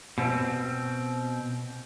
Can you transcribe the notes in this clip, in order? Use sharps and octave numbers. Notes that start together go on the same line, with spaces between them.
B2 C4